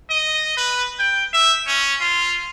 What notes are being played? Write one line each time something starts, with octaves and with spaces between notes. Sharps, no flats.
D#5
B4
G5
E5
C#4
F4